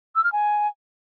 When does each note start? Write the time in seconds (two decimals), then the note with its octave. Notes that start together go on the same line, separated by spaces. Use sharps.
0.15 E6
0.24 F6
0.32 G#5